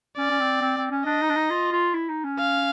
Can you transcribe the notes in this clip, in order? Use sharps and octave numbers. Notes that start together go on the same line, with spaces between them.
C#4 D5
C#4
C4
C4
C4
C#4
D4 D#5
D#4
D4
D#4
F4
F4
E4
D#4
C#4
F5